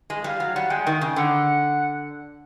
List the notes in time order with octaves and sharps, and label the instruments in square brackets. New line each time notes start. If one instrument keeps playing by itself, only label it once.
[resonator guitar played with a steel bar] G#3
[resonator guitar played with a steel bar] G3 [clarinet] F5
[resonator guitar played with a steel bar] F#3
[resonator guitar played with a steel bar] G3 [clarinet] F#5
[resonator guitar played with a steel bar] G#3 [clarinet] G5
[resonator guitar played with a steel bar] D#3 [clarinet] G5
[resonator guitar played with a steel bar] C#3
[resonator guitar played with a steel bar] D3 [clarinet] F#5